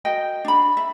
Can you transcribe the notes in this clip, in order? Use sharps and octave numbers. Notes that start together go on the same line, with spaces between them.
F#4 A#4 D#5 G5
D4 B5
E5